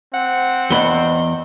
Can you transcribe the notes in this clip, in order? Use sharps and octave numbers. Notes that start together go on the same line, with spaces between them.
C4 F#5
E2 D#5 B5 G7